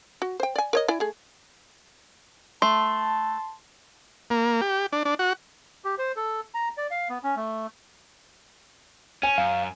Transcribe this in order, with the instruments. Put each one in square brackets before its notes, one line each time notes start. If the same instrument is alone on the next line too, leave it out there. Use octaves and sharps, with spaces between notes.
[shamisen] F#4
C5 G5
D5 G#5
A#4 C#5 D#5
E4 D5 G#5
A3 G#4
[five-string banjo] A3 [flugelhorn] A5 [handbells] C6
[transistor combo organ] A#3
G4
D4
D4
F#4
[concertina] G4
C5
A4
A#5
D5
F5
B3
C#4
A3
[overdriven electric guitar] C#4 [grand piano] G#5
[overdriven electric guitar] F#2 [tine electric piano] F5